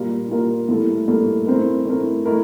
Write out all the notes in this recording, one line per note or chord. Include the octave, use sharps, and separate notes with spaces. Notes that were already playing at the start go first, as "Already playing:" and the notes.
Already playing: A#2 G3 A#3 F4 A#4
A#2 G3 A#3 F4 A#4
A2 G3 A#3 E4 A4
A2 G3 A#3 E4 A4
A3 C4 E4 A#4
A3 C4 E4 A#4
A3 E4 A#4